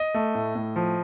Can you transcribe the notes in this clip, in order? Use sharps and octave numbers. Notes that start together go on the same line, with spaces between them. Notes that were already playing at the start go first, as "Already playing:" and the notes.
Already playing: D#5
A3
A2
A2
F3